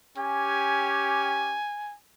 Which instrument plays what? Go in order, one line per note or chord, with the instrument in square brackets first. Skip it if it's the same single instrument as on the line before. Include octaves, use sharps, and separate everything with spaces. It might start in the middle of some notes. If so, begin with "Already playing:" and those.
[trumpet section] C#4 G4 [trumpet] G#5